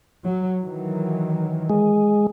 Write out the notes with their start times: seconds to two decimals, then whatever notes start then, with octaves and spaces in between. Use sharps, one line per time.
0.25 F#3
0.60 D#3 E3 F#3
1.70 G#3